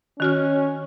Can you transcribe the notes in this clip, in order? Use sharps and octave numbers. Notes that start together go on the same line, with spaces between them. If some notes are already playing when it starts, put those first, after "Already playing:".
D#3 C#4 F#4 F6